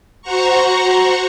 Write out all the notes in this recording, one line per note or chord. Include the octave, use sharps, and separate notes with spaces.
F#4 C5 F#5 A#5 C#6